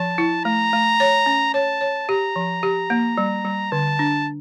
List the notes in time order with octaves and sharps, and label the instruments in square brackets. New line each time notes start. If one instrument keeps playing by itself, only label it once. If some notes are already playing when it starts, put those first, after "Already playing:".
Already playing: [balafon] F3 [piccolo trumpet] A5
[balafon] E4
[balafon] A3 [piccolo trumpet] A#5
[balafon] A3
C#5
C#4
[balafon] C#5 [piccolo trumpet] A5
[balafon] C#5
[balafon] G4 [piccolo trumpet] A#5
[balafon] F3
G4
A#3
G3
G3
[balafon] D3 [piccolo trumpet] A5
[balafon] D4